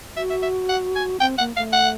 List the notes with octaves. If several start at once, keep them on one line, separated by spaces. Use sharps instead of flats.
F#4 E5
E5
E5
F#5
G#5
C4 G5
A#3 F#5
A3 F5
F#5